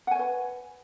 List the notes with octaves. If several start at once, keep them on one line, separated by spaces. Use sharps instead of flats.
B4 C#5 F#5 G#5